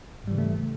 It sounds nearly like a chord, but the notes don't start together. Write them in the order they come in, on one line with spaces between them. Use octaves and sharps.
G#2 G3 E3 C#3 A3